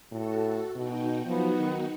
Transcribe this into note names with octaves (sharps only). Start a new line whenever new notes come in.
A2 F#4 A4
B2 D#4 F#4 G5
F3 F#3 B3 D#4 F#4
D#3